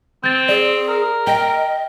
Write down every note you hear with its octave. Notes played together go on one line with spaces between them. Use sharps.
C4 G6 A6
G#4 D5
A#4
D#5 G5